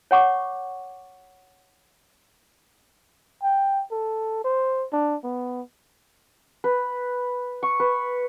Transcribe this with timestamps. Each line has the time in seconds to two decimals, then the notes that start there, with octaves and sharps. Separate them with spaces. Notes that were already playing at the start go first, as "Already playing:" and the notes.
0.11 C#5 F#5 C#6 D6
3.43 G5
3.91 A4
4.44 C5
4.93 D4
5.24 B3
6.64 B4
7.63 C#6
7.80 B4